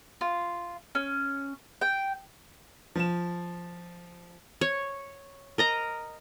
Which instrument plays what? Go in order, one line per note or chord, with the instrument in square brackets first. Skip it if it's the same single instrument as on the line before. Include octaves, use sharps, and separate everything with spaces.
[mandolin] F4
C#4
G5
[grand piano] F3 E7
[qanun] C#5
A#4 D#5 A#5